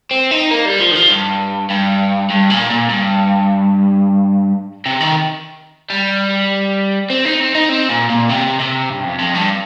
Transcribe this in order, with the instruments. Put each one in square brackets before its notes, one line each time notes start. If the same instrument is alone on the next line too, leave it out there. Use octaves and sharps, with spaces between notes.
[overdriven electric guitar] C4
D#4
A#3
G3
F3
D#3
F3
G2
G2
G2
A#2
A#2
G2
C3
D#3
G3
C4
D#4
C4
D#4
C4
A#2
A#2
C3
C3
G2
F2
F2
G2